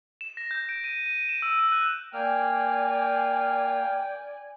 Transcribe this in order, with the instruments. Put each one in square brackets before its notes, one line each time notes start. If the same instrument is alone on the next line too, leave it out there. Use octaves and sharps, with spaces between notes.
[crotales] E7
A#6
G6
D7
D#7
D#7
E7
E6
D#7
F#6
[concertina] A#3 F6 [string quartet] D5 G#5 [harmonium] G5